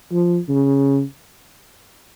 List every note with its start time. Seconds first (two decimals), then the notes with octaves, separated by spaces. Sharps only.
0.12 F3
0.49 C#3